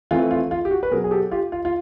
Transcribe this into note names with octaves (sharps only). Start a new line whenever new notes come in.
E3 A3 C4 F4
F4
F4
G4
F#4
B4
B2 F#3 B3 G#4 A#4
G#4
G4 A4
F4 G4
F4
F4